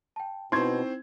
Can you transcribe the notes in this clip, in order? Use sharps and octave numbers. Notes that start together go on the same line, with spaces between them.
G5 A5
B2 C4 D#4 E4 C5 C6 C#6 G#6